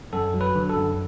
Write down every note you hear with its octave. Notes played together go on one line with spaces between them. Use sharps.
F#2 A4
F#3
B4
D3
A4
F#2